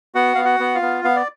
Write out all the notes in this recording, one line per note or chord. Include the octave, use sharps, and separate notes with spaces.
B3 F#4 F#5
B3 F5
F#4 F#5
B3
F4 F5
B3
B3 F5
D5